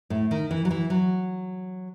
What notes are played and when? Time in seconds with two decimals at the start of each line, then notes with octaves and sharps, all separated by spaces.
0.10 A2
0.31 D#3
0.51 E3
0.65 F#3
0.71 E3
0.90 F#3